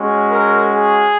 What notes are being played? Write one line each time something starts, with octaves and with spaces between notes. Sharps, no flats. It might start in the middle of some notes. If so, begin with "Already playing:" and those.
Already playing: G#3 C#4 F#4
A#4
G#4